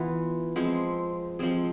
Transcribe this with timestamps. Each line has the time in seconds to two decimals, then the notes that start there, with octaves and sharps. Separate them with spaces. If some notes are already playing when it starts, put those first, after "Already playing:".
Already playing: E3 B3 F4
0.56 F3 G#3 C4 G#4
1.39 F3 G#3 C4 G#4